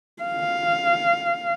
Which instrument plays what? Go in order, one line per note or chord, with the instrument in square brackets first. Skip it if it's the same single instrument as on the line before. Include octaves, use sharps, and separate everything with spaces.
[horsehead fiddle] F5